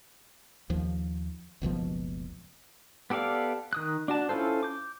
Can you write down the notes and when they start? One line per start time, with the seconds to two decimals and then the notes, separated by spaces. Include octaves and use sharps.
0.70 D#2 F3
1.62 F#1 C#2 B2 F3
3.10 B3 G4 A4 D5 F5
3.73 D#3 D#6 F#6
4.08 D4 F#4 A5
4.29 C#4 E4 F4 A4 C5
4.63 D6 G6